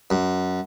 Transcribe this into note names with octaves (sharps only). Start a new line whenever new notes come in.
F#2